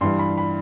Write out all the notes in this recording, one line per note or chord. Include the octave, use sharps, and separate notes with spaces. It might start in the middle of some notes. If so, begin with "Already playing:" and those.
G2 E3 G3 C6
B5
B5